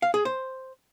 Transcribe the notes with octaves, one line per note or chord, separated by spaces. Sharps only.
F5
G#4
C5